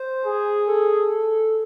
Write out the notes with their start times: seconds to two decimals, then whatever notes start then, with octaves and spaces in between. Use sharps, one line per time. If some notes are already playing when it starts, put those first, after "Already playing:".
Already playing: C5
0.25 G#4
0.67 A4